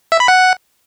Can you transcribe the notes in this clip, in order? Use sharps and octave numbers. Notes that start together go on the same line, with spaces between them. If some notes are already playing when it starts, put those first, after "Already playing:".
E5
B5
F#5